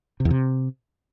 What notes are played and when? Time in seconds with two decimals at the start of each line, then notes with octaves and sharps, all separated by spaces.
0.20 C3
0.25 E2
0.30 C3